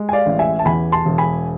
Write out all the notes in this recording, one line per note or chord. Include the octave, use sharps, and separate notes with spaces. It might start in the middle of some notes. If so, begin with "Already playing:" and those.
Already playing: G#3
G#5
D5 F5
A1
E5 G#5
A5
E2 G#5 B5
A5 C6
E1
G#5 B5